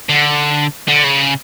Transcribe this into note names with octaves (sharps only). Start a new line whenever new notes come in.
D3
D3
C#3